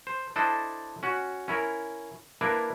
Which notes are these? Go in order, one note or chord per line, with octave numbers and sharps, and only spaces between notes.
C5
D4 E4 A4 C5 D#5
C#4 F#4
C#4 E4 A#4
A#3 D4 E4 A#4 B4